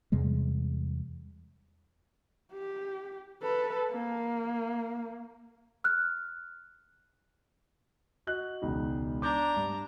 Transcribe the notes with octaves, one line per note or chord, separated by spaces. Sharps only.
E2 C3 G3 G#3
G4
A4 B4
A#3
F6 F#6
F#4 D#5 F#6
E1 C#2 D#4
D4 A#5 D6 G6
G2